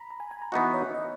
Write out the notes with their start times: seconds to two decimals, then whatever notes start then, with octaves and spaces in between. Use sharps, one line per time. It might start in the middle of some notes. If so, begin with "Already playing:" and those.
Already playing: A#5 B5
0.11 A#5
0.20 G#5
0.31 G#5
0.42 A#5
0.52 E3 B3 D#4 F#4 D#5
0.74 C#5
0.95 D#5